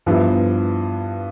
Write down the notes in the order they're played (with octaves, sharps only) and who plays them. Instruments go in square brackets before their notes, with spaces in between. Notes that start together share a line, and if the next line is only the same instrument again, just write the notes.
[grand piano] G2 F3 B3 E4